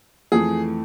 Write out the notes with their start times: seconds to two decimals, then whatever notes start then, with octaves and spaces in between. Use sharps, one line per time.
0.32 F2 E3 A3 G#4